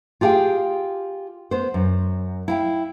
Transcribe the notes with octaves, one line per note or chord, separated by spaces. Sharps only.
F4 G4 G#4 F5 G5
B3 C5
F#2
E4 F5 G5